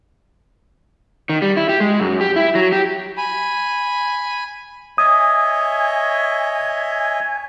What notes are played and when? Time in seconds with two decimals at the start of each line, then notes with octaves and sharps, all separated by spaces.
1.29 D#3
1.42 G3
1.57 E4
1.69 G4
1.80 G#3
2.00 F#2
2.21 G4
2.36 E4
2.55 F#3
2.72 G4
3.17 G#5 B5
4.98 C#5 D#5 E5 G#5 D#6